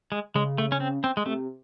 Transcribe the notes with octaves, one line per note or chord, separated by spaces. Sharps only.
G#3
C#3 G#3
A3
C#4
C4
C4
G#3
C3 A3